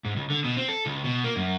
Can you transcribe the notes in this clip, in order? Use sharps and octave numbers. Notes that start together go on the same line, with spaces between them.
G#2
C#2
D3
B2
C4
A4
C#2
B2
A#3
F#2